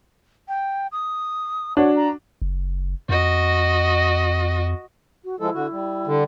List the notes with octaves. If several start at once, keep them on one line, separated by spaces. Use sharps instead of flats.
G5
D#6
D4 F#4 C#5
A#5
F#1
F2 F#4 D#5
F#4
F3 G#3 E4 A4
D3 F#4
G3
D3